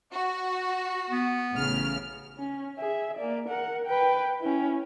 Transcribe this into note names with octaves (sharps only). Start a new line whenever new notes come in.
F#4
B3
A1 C#3 F6
C#4
G#4 E5
A#3 D5
A#4 F#5
B4 G5
C#4 E4